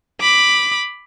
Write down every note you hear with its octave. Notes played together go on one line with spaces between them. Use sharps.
B5 D6